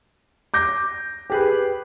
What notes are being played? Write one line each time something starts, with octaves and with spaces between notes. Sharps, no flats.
D6 G6 A#6
G4 G#4 B4